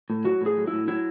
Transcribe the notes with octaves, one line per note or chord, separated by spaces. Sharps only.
A2
F#3 F#4
A2
G#4
F#3
E4
A2
F#3 E4